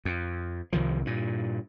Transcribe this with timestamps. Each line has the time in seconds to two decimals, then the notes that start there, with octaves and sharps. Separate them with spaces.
0.05 F2
0.73 C2 D#3 F3
1.05 G2 A#2